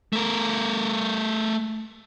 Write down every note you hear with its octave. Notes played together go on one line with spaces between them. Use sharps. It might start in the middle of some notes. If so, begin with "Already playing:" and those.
A3 A#4